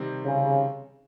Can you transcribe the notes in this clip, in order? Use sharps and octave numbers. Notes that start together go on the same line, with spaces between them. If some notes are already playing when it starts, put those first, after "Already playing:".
Already playing: C3 D#3 G3 C4
C#3